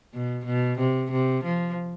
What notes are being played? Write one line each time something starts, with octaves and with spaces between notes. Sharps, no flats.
B2
B2
C3
C3
F3